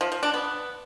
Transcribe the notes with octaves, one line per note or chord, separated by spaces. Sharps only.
F3
F3
D4
B3